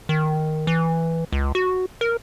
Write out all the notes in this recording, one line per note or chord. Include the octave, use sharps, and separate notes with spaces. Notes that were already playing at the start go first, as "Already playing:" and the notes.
D#3
E3
C#2
F#4
A#4